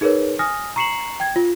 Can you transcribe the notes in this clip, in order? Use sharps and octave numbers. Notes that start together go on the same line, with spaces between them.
D#4 G#4 A#4 B4 C#5
G#5 D#6 F6 A#6
A#5 C#6 C7 C#7 E7 F#7
G5 G#6
F4